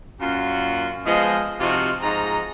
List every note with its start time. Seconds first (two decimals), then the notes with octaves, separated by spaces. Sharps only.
0.21 F#2 A#2 F4 F#4
1.06 F3 G#3 B3 D#5
1.60 C3 F3 D#4 F4 F#4
2.02 G#2 F3 D#4 A#5